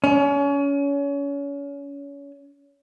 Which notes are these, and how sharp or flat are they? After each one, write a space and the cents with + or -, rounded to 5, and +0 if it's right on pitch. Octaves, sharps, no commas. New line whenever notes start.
C#4 +30